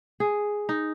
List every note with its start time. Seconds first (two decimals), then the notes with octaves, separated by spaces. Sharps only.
0.20 G#4
0.69 D#4